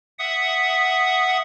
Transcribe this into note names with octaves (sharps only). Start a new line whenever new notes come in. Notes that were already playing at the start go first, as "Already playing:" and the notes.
E5 F#5 D#6